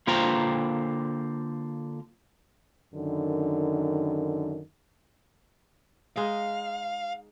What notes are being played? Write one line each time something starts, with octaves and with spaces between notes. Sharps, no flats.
D3 A#3 F4 C5 G5 A#5
F#2 D3 D#3
G#3 D#4 F5